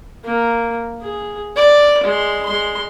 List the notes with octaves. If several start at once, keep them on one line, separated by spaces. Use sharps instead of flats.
A#3
G#4
D5
G#3 C6
G#3 C6